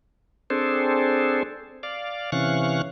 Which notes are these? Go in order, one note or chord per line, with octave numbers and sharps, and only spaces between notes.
C4 D4 G#4 A4 C5
D5 F5
C3 E3 C#4 F5 C#6 F#6